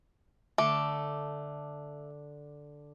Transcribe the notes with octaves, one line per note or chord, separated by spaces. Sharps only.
D3 A3 D6